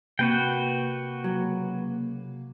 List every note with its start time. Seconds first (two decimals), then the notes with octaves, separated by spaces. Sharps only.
0.19 C3 A#3 F#4 B4 G5
1.24 C#2 F#3